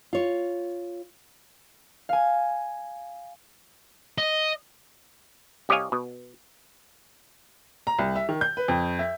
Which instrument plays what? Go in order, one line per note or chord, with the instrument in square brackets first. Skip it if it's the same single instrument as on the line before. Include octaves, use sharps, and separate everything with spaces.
[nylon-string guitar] F4 C#5
[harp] F5 G#5
[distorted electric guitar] D#5
[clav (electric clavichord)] C2 G4 C#5 D#5 F5 G#5
B2
[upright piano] A#5
C2
E5
D#3
G6
B4
F2
E5